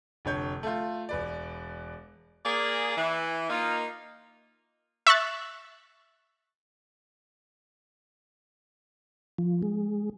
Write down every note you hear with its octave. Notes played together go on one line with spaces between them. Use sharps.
F1 D3 C#5 G6
A3 F4
E1 B4 D5
A#3 G#4 D5
E3
A#3 D#4 F4
E5 C#6 F#6 A6
F3
G#3